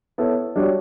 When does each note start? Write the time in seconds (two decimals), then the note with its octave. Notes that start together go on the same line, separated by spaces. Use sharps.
0.18 B3 E4 A4 C#5
0.56 G3 D4 F#4 C#5